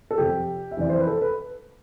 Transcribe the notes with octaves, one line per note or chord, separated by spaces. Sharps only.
A4
F2 C3 F3 G4
E5
F2 C3 E3 D5
C5
B4
A4
B4